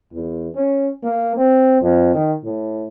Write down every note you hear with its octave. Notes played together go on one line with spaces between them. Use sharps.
E2
C#4
A#3
C4
F2
D#3
A2